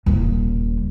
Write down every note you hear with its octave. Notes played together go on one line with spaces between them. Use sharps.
D#1 C#3